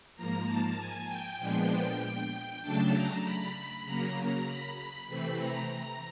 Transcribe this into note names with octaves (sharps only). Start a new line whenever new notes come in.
G#2 F3 A#3 A#5
A5
G#5
G5
A#2 F3 G#3 B3 D4
C#3 F#3 A3 D4 A5
A#5
B5
C#3 F#3 A#3 A#5
A#5
B5
B5
C3 E3 A3 C4 B5
A#5
A#5